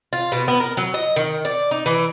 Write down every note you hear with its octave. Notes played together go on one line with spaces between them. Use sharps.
F4
B2
B3
A#4
F#3
D#5
D#3
D5
D#4
E3